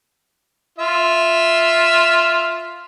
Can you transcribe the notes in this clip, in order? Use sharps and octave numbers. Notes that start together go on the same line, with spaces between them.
F4 E5